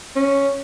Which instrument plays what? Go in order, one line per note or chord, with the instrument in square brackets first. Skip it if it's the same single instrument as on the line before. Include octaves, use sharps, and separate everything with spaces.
[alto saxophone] C#4